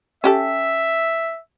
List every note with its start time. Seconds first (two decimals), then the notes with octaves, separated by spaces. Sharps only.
0.24 C#4 G4 A4 E5